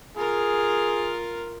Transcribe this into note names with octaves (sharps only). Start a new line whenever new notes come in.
F4 G#4 A#4